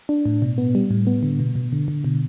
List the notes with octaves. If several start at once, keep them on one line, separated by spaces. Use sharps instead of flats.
D4
A2
B2
B3
G3
A2
B3
D3
B2
B2
D3
D3
B2